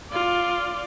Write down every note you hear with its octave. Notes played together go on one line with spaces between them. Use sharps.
F4 D5